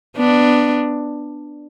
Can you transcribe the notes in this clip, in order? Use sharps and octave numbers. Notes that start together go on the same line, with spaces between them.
B3 D4